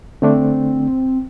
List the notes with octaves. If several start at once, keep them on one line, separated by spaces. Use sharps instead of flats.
D3 A3 C4 D4